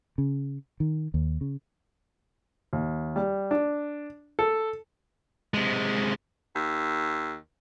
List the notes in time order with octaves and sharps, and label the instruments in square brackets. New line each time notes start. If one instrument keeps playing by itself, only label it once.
[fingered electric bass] C#3
D#3
D#2
C#3
[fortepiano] D#2
G3
D4
A4
[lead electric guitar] C3 G#3
[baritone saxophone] D#2